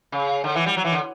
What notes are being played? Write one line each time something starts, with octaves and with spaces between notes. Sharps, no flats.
C#3
D3
E3
G3
F#3
E3
D3